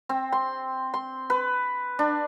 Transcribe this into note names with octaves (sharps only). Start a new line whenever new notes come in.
C4
C6
C6
B4
D4